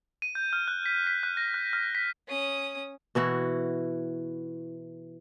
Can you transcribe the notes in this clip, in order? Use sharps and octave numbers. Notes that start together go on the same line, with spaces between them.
D#7
G6
F6
F#6
B6
B6
F#6
A#6
F#6
F6
B6
C#4 D#6
B2 E3 E4 F#4